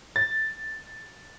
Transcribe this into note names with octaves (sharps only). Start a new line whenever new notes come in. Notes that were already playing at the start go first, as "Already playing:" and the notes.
A6